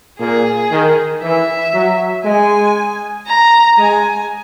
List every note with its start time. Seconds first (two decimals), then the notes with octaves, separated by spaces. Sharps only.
0.20 A#2 G#4
0.72 D#3
1.23 E3 E5
1.74 F#3
2.25 G#3 G#5
3.27 A#5
3.78 G#3 G#5